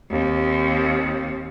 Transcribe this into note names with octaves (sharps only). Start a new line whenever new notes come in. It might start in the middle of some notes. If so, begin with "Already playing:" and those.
D#2 C4